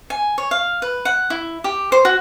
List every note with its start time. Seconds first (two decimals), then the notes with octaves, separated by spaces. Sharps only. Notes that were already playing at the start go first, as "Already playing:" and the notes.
0.10 G#5
0.38 C#5
0.51 F5
0.82 B4
1.05 F#5
1.30 E4
1.64 G4
1.92 C5
2.05 F#4